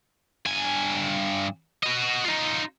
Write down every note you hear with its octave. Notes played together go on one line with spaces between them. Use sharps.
G2 G#5
F#4 D#5
D#4 F4